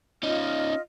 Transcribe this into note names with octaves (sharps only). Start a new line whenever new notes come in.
C#4 D#4 F4 D#5 F6